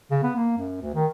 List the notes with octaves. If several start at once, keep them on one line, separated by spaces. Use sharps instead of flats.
C#3
B3
A#3
F#2
D2
D#3